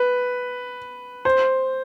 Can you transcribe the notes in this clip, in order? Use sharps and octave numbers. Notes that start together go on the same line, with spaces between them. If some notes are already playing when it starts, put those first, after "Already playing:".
Already playing: B4
C5